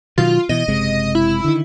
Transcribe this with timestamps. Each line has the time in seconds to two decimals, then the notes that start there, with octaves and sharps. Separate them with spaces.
0.18 B2 D#3 F#3 F4
0.49 B2 E3 D#5
0.68 F#1 C3 G#3
1.15 E4
1.44 D3 D#3